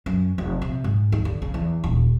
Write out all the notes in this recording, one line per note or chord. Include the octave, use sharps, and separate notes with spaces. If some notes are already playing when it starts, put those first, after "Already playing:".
F#2
F1
C3
G#2
D#2
D3
C#3
E2
D#1